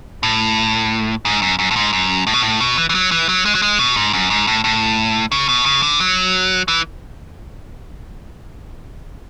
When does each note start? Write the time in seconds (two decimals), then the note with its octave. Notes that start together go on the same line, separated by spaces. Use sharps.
0.23 A2
1.25 G#2
1.42 F#2
1.59 F#2
1.71 A2
1.76 G#2
1.93 F#2
2.27 A2
2.34 B2
2.41 A2
2.60 B2
2.78 E3
2.89 E3
2.95 F#3
3.11 E3
3.29 F#3
3.45 G#3
3.55 F#3
3.62 G#3
3.79 B2
3.96 G#2
4.13 F#2
4.30 G#2
4.47 A2
4.64 A2
5.32 C#3
5.49 B2
5.66 C#3
5.83 D3
6.00 F#3
6.68 E3